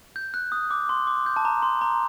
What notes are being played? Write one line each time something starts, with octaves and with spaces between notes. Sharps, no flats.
G6
F#6
D#6
D6
C6
D6
G6
A5
A#5
C6
A#5